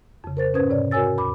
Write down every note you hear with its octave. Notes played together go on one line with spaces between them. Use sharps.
F2 C#3
A#4 C5 A6
G#2 C#4 B4 C5 D#6 G#6
G#2 C3 C#5 D5
F#4 A#4 C#5 G#5 E6 A6
D#2 B5 D6